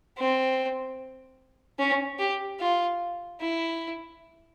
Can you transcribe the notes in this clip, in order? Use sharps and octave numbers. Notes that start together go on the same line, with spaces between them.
C4
C#4
G4
F4
E4